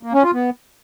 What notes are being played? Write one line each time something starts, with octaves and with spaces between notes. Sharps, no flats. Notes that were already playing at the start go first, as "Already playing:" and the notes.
A#3
C#4
F4
B3